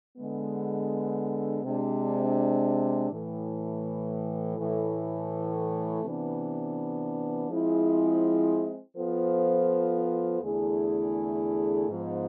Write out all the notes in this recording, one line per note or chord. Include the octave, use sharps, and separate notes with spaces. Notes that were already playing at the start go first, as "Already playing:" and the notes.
D3 G#3 B3
C3 G#3 D4
A2 E3 A3
A2 E3 A3
C3 E3 B3 D4
F3 G#3 C4 E4 G#4
F3 B3 F4 A4 C5
E2 D3 A3 E4 G#4
G#2 F3 B3